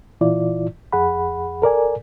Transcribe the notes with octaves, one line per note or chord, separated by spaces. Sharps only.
A#2 E3 E4 F4 D5
F2 G#4 F#5 B5
A4 A#4 D5 G#5